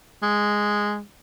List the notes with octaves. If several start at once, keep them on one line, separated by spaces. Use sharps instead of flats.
G#3